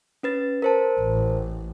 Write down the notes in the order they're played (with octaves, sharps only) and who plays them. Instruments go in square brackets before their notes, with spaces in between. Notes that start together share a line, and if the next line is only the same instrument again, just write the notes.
[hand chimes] C#4 B4 A6
A#4 C5 A5
[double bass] A1